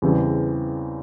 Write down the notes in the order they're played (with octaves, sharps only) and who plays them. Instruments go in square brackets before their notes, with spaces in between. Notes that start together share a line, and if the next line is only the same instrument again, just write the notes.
[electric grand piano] E2 C#3 E3 G3 C4